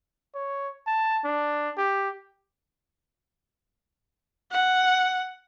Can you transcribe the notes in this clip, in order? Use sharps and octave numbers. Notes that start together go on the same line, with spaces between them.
C#5
A5
D4
G4
F#5